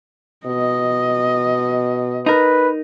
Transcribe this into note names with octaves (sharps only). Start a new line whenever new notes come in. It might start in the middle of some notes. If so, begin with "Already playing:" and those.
B2 D#5
D#4 A#4 B4